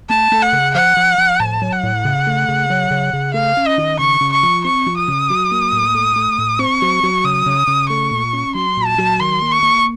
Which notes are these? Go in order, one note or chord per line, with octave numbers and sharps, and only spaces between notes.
A3 A5
A3
F#5
C#3
F3 F#5
F3
F3
A2 A5
F#3
F#5
A2
C#3
A3
C#3
F#3
C#3
C#3
A3 F5
C#4
D#5
D#3
C#3 C#6
C#3
C#6
F3
C4 C#6
F3
D#6
C#3
F#3
A#3
A2
A3
A3
A2
C4 C#6
F#3
F#3
C#3 D#6
C#3
C#3
A3 C#6
A#2
C#4
F#3 C6
A#2
A5
F#3
D#3 C6
A#3
C#6
A#3